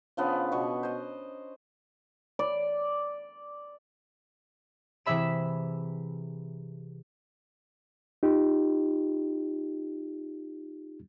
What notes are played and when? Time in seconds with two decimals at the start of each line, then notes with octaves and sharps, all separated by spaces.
0.17 C#3 F3 B3 D4
0.52 B2 C#6
0.83 C5 D#5
2.39 D5
5.06 C3 E3 G#4 E5 B5 E7
8.23 D#4 F4 G4